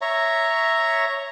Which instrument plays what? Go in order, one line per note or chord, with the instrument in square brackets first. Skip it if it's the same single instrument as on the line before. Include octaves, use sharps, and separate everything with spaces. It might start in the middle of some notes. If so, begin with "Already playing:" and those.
[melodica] C#5 E5 A#5